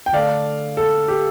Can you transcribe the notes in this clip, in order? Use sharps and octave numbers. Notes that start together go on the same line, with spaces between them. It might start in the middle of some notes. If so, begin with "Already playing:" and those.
G5
D3 A3 D4 D5 F5
A4
G4